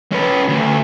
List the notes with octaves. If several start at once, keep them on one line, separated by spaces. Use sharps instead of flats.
C#4 B4
D2